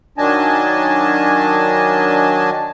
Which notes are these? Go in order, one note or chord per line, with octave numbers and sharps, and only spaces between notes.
D#3 F#3 D4 D#5 G#5 A5